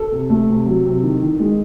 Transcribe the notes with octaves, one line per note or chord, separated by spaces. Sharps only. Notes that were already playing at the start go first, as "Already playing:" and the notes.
Already playing: A4
C3
A3
C3
F#3
C3
D#3
D#3
G#3